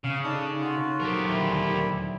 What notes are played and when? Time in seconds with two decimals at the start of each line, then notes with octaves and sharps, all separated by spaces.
0.04 C#3 F5
0.24 D4 D#4 A4 D#6
0.61 F4 F#4
1.00 F#3 G4 A4 A#4 C5
1.29 D#1 D2 E4 C6